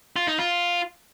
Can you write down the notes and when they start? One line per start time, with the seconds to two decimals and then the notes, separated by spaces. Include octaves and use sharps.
0.16 F4
0.27 D#4
0.39 F4